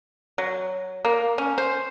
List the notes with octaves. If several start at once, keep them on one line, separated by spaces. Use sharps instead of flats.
F#3
A#3
C#4
C5